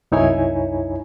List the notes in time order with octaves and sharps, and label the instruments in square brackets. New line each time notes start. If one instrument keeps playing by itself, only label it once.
[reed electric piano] C2 F#2 D#4 E4 C#5 G#5